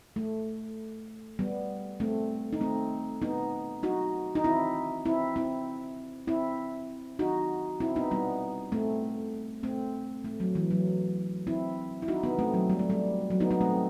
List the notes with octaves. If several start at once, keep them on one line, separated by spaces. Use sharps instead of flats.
A3
G3 B3
A3 C4
D#4
A3 C4
B3 D#4
D#4 F#4
D#4
C4 E4
C4 E4
C4 E4
C4 E4
D#4 F#4
C4 E4
B3 D#4
G3 B3
A3 C4
A3 C4
A3
F#3
E3
F#3
C4 E4
E4
D#4 F#4
B3 D#4
A3 C4
F#3
G3
A3
G3
F#3
B3 D#4
B3 D#4
A3 C4